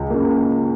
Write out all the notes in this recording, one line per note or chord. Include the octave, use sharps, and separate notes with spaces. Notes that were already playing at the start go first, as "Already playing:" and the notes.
Already playing: C#2
C#3 A#3